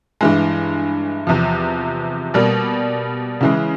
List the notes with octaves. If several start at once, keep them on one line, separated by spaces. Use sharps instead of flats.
G2 E3 G#3
E2 C3 F3
B2 G3 A#3
C#3 E3 G#3